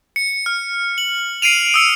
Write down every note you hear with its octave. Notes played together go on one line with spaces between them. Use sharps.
C#7
F6
F#7
C7 D7 D#7 F7
D#6 E6 C#7